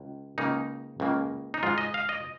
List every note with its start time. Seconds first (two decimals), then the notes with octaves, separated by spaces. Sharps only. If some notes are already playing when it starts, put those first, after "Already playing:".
Already playing: C#2
0.38 C#2 C#3 A#3 D#4
1.00 C#2 C#3 A#3
1.54 D#4
1.63 G#2 G#3 F4
1.78 D#5
1.94 F5
2.09 D#5